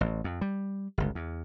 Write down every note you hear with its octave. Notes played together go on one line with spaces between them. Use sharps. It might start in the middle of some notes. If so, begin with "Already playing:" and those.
A1
F2
G3
G1 C#2
E2